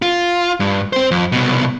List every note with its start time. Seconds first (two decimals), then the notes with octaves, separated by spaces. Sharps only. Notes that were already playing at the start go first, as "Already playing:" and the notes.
0.02 F4
0.60 G2
0.93 C4 C5
1.11 F2
1.32 C2 B2